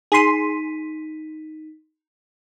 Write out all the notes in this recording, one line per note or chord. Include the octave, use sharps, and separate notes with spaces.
D#4 G#4 C6 B6 D#7